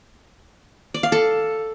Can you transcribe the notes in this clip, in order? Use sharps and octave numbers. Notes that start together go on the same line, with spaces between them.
D5
F5
A4